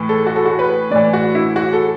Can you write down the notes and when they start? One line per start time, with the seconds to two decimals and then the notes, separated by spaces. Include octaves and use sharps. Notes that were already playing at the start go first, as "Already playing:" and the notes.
Already playing: A2 E3
0.09 A4
0.27 F#4
0.36 A4
0.46 F#4
0.59 B4
0.91 A2 E3 D5
1.13 F#4
1.35 E4
1.56 F#4
1.73 A4